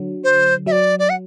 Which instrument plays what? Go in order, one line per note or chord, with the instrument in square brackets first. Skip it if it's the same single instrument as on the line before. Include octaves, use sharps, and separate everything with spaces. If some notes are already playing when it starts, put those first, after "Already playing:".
Already playing: [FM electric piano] D3 F#3
[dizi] C5
[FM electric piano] F#3 [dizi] E5
[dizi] D5
D5
F#5